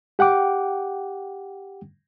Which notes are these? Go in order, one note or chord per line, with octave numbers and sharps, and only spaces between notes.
G4 F#5 G5 D6